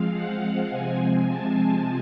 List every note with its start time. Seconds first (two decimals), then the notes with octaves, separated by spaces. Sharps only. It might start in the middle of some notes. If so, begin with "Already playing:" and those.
Already playing: F3 G#3 C4 F5
0.13 F#5
0.70 C3 F3 G#3 C4 G#5
1.28 A5